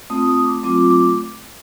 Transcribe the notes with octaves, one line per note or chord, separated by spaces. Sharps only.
A3 C4 F4 D#6
D#6
D6
F#3 A3 C4 F4 D6
D6